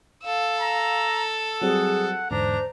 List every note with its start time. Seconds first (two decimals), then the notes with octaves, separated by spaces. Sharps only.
0.24 A4 F5 E6
0.60 A#5
1.61 F#3 G3 C4 G#4 F#5
2.31 E2 G#2 D3 D4 C5 A#5